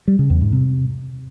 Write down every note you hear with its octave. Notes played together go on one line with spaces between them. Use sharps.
G3
C#3
E2
G#2
C3